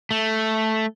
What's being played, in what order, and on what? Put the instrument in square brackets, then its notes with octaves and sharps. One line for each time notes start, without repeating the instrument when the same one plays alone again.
[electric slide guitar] A3